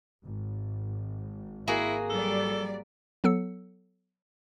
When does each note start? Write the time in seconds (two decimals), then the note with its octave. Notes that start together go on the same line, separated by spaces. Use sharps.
0.24 G#1
1.68 A#3 E4 F#4 G#4
2.10 F#3 G3 A4 D5
3.24 F#3 B3 A4 E6 C#7